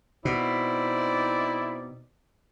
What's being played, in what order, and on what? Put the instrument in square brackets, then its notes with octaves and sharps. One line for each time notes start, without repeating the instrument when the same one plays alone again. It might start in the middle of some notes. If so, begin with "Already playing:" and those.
[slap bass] B2 [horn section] C4 D#4 D5 [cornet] E4